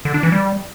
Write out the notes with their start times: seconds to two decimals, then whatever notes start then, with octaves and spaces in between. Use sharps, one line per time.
0.05 D3
0.14 D4
0.23 E3
0.32 G3